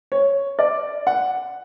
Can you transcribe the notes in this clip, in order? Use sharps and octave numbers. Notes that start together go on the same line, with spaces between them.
C#5
D5
F#5